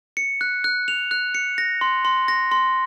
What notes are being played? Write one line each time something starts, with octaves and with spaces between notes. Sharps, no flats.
C#7
F#6
F#6
F7
F#6
C#7
A#6
C6
C6
A#6
C6